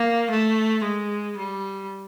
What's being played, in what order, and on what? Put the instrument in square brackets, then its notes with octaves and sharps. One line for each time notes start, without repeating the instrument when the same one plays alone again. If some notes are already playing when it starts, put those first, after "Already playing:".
Already playing: [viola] A#3
A3
G#3
G3